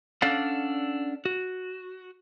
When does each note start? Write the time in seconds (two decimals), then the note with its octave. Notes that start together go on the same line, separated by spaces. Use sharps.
0.22 C#4 D4 A4 D5 F5 F#5
1.25 F#4